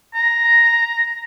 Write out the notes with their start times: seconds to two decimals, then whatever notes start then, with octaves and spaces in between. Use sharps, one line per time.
0.14 A#5